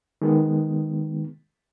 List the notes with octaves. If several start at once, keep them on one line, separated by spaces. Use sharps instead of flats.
D#3 G#3 B3